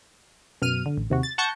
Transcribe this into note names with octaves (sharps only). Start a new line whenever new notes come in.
F#2 B2 F6 D#7
D3
A1
D#2 C3 F#4
A6
F#5 A5 C#6 G6 A#6 C#7